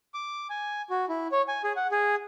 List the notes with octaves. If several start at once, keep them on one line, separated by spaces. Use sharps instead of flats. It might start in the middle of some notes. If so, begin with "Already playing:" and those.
D6
G#5
F#4
E4
C#5
G#5
G#4
F#5
G#4